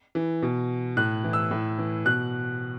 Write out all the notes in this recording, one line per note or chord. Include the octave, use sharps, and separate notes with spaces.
E3
B2
A2 F#6
E3
E6
A2
E3
B2 F#6